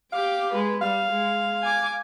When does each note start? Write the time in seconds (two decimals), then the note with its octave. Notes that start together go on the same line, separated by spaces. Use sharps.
0.12 G4 F5 D6
0.52 G#3 B4
0.82 G3 F5
1.10 G#3
1.63 G#5 D6